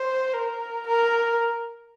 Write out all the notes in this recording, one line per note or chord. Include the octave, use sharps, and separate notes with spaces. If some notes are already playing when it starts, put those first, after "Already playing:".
Already playing: C5
A#4
A#4